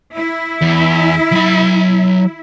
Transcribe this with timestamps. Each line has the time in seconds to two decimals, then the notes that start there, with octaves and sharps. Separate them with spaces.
0.14 E4
0.61 E2
1.32 F#3 B5